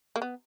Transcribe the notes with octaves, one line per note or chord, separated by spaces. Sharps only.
A#3
B3